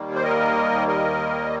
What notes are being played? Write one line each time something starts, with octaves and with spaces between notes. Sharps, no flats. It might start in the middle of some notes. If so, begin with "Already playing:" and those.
Already playing: D#2 D#3 G3 A#3
C5
A#4 D#5
A#4 D#5